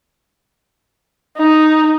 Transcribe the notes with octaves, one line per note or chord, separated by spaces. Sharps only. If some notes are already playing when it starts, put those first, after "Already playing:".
D#4